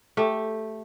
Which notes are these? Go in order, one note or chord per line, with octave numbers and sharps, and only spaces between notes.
A3 G4